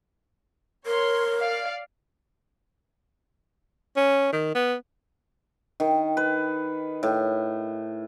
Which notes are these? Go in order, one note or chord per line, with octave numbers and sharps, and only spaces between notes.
A#4 C#5 C6
D5 F5
C#4
D#3
B3
D#3
B4
A2